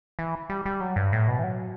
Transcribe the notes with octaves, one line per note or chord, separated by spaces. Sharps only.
E3
G3
G3
F#3
G2
A2
B2
E3
F#3